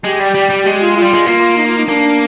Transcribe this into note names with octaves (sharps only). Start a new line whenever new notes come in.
G#3 G4
G3
G3
G3
G#3 G4
F4
F4
G3
G#3
A#3 F4
D#4
F4
D#4
A#3 D4